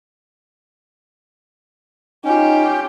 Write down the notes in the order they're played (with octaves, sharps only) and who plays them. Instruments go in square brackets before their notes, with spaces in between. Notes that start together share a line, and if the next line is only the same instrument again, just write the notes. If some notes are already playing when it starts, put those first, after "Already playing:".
[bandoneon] C#4 [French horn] D#4 [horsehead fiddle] F4 G4